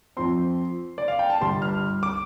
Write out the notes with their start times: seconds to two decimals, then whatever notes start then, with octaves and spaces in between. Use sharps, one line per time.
0.17 F2 F3 C4 C6
0.98 D5
1.08 F5
1.19 G5
1.30 A5
1.41 G1 G2 G3 C6
1.62 F6
2.03 D6